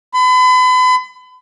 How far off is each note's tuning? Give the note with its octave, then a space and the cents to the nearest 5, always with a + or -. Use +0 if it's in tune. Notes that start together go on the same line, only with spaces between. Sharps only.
B5 +40